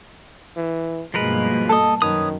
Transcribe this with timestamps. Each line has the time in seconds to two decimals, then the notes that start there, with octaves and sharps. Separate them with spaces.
0.56 E3
1.14 G2 B2 F3 G#3 A#3 A#4 B4
1.69 A4 D#5
2.02 F#2 D#3 B4 C#5 D#6